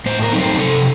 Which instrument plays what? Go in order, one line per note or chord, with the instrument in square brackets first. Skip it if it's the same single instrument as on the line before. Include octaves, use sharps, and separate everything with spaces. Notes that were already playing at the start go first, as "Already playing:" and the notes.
[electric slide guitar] A2 C5
A#4
F#3 A3 C4 D#4
C5
C3 A4